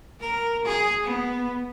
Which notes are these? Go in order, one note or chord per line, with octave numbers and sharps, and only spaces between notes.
A#4
G#4
B3